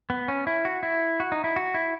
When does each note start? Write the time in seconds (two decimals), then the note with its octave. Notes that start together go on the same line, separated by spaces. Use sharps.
0.10 B3
0.28 C#4
0.47 E4
0.65 F#4
0.83 E4
1.20 F#4
1.32 D#4
1.44 E4
1.56 F#4
1.74 E4